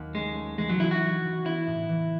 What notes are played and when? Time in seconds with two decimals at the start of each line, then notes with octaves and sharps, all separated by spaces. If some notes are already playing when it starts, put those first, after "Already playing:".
Already playing: D#2 F#3
0.15 G#3 C#4
0.36 A3
0.58 E3 G#3
0.69 F#3
0.80 E3 E4
0.91 F#4
1.02 F#3
1.24 F#3
1.46 B3 E4
1.67 A2
1.89 E3